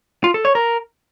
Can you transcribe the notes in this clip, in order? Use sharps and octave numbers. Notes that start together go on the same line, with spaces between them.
F4
A4
C#5
A#4